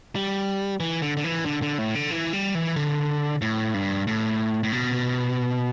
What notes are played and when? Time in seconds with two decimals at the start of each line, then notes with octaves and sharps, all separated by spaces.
0.15 G3
0.80 E3
1.02 D3
1.17 D3
1.24 E3
1.45 D3
1.62 D3
1.78 A2
1.95 D3
2.11 E3
2.33 G3
2.55 E3
2.76 D3
3.42 A2
3.74 G2
4.07 A2
4.63 A2
4.72 B2